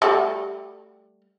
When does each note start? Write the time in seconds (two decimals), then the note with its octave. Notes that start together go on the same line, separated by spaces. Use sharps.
0.02 G3 A3 F#4